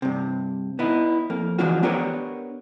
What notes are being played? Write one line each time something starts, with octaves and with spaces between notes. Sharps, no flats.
G2 C3
B3 D#4 E4
F2 A#3
E3 F3 G#3 D4 F4 F#4
B3 D4 G4 A#4 B4 C#5